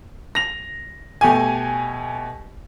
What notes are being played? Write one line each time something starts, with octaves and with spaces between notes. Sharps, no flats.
A#6 F7
B2 A3 G4 G#5